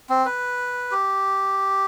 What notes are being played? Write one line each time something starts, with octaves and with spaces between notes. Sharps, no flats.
C4
B4
G4